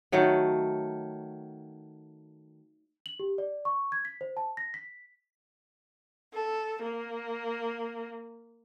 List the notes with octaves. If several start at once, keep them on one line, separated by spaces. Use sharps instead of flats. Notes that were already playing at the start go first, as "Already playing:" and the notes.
D#3 F#3 A3
F#7
G4
D5
C#6
G#6
B6
C5
A5
A#6
B6
A4
A#3